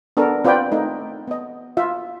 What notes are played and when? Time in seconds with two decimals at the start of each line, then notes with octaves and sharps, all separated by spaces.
0.17 B3 D4 A4 A#4
0.45 C4 F4 B4 D5 G5
0.71 A3 D#4
1.28 B3 D#5
1.77 F4 E5